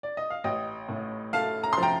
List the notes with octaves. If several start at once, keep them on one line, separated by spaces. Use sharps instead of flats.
D5
D#5
F5
A1 D#5 G5
A2
A3 F5 A5
A#5
C6
F3 G5 A#5